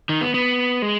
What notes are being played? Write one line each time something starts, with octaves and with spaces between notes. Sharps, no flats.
D#3
B3
B3
G#3